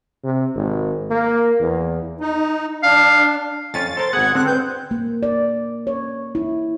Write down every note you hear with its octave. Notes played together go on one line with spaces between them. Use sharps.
C3
G#1
A#3
E2
D#4
D4 F5
F2 C#4 F4 A6
A4 A#4 C5 C6
G#1 B3 G#4 F#5 G#6
D3 C4 F#6
B4 G6
A#3
D5
C#5
E4